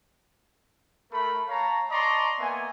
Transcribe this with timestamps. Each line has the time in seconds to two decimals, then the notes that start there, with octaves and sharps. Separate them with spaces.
1.12 A3 A#4 B5
1.48 C#5 F5 A5 A#5
1.90 D5 D#5 A5 A#5 C6 C#6
2.39 A#3 B3 E5 G#5